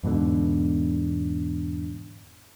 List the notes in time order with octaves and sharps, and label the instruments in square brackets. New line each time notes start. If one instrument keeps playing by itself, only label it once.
[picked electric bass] E2 G#2 B2 D3